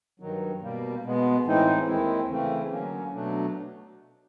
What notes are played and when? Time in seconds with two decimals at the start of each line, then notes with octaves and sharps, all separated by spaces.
0.20 G2 D#3 F#3
0.62 B2 G3 A#3
1.03 B2 G#3 B3
1.45 A2 E3 G#3 C4 D#4
1.87 D#2 D#3 G#3 C4 E4
2.29 C#3 E3 A3 C4
2.70 D3 F#3 A#3 C#4
3.13 B2 F#3 A3 D4